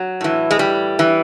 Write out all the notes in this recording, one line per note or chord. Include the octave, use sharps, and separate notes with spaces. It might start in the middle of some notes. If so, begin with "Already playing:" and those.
Already playing: F#3
A2 E3
G#3
G3
E3